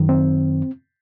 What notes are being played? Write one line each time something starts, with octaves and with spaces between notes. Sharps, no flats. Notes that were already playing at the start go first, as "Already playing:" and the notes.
Already playing: F#2 D#3
C4